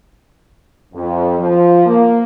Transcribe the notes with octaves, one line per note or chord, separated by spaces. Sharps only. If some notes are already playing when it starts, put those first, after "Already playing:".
F2
F3
A#3